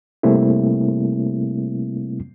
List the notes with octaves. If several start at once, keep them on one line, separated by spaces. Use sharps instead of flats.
C3 G3 A3 A#3 C4 E4